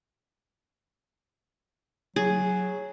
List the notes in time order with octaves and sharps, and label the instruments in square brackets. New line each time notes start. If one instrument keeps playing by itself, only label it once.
[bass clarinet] F#3 [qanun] G#4